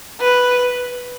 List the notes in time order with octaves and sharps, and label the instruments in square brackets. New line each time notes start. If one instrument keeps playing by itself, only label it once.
[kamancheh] B4